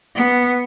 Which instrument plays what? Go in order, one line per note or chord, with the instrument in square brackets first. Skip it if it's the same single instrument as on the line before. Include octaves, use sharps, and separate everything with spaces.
[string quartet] B3